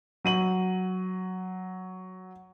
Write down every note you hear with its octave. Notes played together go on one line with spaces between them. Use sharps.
F#3 D#7 F#7